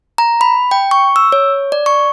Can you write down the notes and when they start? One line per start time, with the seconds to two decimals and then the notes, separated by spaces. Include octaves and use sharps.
0.18 A#5
0.41 B5
0.71 G5
0.91 C#6
1.16 E6
1.32 C#5
1.72 D5
1.86 C#6